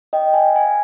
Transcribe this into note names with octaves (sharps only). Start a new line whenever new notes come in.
D#5 G5
F5 G#5
F5 G#5